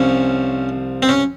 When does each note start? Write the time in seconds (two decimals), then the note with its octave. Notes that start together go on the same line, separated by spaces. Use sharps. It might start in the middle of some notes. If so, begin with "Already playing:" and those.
Already playing: C2 C3 F3 C#4
1.02 C4
1.09 C#4